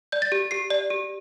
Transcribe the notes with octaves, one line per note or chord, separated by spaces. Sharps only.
D5 G6
A6
G4
G4 C7
D5
G4